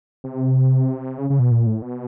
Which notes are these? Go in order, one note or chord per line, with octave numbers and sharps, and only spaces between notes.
C3
C#3
C#3
B2
A#2
A2
B2